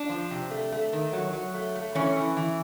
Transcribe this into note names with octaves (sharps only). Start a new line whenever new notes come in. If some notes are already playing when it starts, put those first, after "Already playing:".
Already playing: D4
F3
C3
A3
A3
D#3
F#3
F#3
A3
A3
E3 C#4
E3
E3